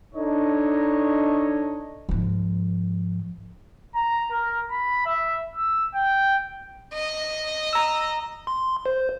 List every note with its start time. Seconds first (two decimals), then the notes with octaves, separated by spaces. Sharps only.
0.15 D4 D#4 A4 C#5 D#5
2.09 G#2 F3
3.95 A#5
4.31 A#4
4.71 B5
5.06 E5
5.56 E6
5.94 G5
6.93 D#5
7.73 A#5 E6
8.47 C6
8.86 C5